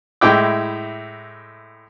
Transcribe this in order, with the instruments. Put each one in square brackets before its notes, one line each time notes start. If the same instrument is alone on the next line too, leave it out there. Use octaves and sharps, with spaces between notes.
[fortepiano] A2 G#3 E4 G5 D6